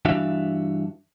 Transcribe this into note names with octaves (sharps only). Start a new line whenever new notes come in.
G2 E3 D4 F#4 E5 F5